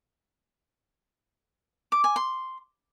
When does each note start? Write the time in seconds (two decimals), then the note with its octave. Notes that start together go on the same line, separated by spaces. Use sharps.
1.92 D6
2.04 G#5
2.16 C6